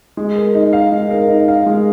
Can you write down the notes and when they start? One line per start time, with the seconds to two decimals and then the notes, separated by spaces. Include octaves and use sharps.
0.17 G#3
0.36 A#4
0.55 D#4
0.73 F5
0.92 G#3
1.11 A#4
1.28 D#4
1.48 F5
1.66 G#3